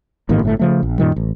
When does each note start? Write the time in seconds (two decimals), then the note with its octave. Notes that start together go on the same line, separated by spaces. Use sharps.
0.29 A1 G#2 D#3 A#3
0.43 G1 A2 A3
0.59 C#3 F3 A3
0.83 A#1
0.98 F#2 A#2 D#3 G3
1.16 A1